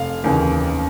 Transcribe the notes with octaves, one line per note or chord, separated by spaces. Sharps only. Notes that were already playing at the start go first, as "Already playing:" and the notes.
Already playing: F1 F5
D#2 C#3 E3